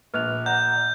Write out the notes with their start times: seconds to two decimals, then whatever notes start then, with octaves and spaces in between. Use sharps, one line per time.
0.14 A#1 B4 F6 F#6 F7
0.46 D5 F#5 A#5 G6